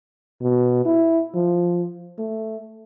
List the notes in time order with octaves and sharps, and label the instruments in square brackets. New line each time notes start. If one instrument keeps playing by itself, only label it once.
[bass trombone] B2
E4
F3
A3